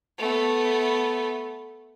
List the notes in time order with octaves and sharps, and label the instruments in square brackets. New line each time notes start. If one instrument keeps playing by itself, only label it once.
[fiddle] A3 B3